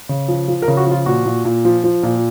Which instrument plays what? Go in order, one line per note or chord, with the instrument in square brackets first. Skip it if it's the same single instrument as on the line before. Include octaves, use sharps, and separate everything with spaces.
[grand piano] C#3
F3
F3
A#4
C#3
F#4
F3 F4
A#2 F#4
A#2
A#2
F3
F3
A#2